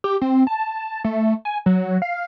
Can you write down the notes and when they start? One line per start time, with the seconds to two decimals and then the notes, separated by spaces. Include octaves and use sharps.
0.04 G4
0.22 C4
0.47 A5
1.04 A3
1.45 G#5
1.66 F#3
2.02 F5